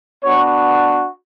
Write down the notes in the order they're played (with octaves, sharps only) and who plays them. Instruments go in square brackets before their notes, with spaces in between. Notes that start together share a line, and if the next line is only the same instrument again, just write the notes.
[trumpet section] B3 D4 F#4 C#5 C#6